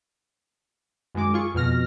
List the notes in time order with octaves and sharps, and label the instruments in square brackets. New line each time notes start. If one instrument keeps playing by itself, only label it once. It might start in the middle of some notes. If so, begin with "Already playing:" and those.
[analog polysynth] F#2 D#3 G#3 D6
F4 G#4 C#6
F2 B2 F6 A#6